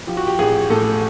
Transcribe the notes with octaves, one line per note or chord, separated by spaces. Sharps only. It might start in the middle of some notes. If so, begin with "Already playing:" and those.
F3 G4
F#4
G4
A1 G#4
A2 A4